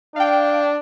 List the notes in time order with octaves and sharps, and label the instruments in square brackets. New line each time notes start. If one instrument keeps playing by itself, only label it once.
[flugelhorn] D4 [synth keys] F5 G5